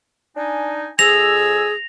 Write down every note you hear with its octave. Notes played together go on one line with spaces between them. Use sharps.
D4 D#4 G#5
F2 G#4 G#5 E6 A#6 F7